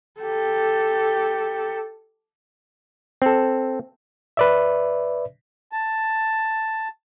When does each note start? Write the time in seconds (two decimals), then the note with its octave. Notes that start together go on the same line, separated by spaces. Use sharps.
0.21 G4 A4
3.22 C4 A4
4.37 B4 D5 E5
5.73 A5